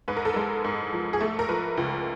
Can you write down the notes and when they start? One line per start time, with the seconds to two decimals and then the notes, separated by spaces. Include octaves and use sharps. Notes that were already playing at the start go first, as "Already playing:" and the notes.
0.08 G#2 B4
0.17 A#4
0.25 A4
0.34 G#3 A#4
0.64 G#2
0.93 F3
1.13 G#4
1.21 A3 A4
1.39 A#4
1.49 F3 B4
1.77 C#2